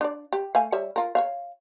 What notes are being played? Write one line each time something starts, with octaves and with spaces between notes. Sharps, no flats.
D4 D5
G4
A3 F5 G#5
G3 C#5 E5
F4 A#4
C#5 E5 F5